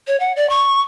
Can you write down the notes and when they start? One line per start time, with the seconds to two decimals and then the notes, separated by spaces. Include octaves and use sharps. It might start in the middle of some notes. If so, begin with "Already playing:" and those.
0.08 C#5
0.20 F#5
0.36 D5
0.50 C#6